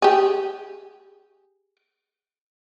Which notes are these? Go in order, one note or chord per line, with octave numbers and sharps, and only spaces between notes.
G4 G#4